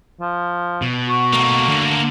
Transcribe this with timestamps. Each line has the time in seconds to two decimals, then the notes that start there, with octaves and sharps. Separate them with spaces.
0.20 F3
0.82 B2
1.09 F#4
1.33 A3 A#3
1.69 D3